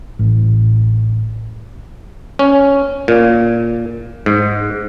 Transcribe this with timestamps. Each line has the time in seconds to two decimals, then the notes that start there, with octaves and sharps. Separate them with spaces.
0.19 A1
2.39 C#4
3.08 A#2
4.26 G#2